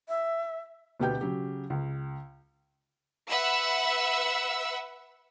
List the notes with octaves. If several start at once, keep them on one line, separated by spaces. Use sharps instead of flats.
E5
D2 B2 B3 G4 G5 G6
C#3 F#3 G4
C#2
B4 E5 F#5 E6